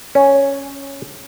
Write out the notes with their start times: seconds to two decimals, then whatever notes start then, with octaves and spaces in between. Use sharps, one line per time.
0.15 C#4